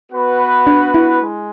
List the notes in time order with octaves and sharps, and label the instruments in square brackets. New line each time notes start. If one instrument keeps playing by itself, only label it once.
[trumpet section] B3 F#4 B4
[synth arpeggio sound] D4
E4
[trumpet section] G#3